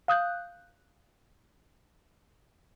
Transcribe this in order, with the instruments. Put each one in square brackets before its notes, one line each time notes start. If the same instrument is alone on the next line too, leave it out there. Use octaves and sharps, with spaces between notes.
[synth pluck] F5 D#6 F#6 G6